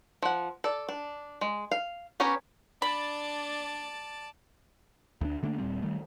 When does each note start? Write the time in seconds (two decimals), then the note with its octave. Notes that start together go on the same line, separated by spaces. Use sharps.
0.22 F3 F#5
0.64 A4 D5
0.89 D4
1.41 G#3
1.71 F5
2.20 B3 C#4 G4 A#4 C#5
2.82 D4 D5 A5 B5
5.21 D2 D4
5.43 D3 A3 A#3 D4
5.58 D#1 A#2 G3 C4
5.82 D#3 G3 A3